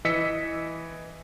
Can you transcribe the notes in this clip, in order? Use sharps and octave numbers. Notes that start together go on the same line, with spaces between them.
E3 D#5 E6 B6 C#7